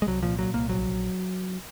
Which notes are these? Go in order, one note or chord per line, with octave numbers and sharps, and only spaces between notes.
G#3
C2 F#3
A#2 F3
A#2 F#3
C2 A#3
A#1 F#3